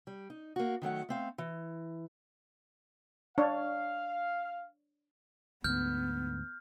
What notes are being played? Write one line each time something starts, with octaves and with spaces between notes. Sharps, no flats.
G3
D#4
A#3 F#4
D#3 F#3 A3 F#5
A3 C4 F5
E3
D4 C#5 F5
D2 G#2 B3 F6 G6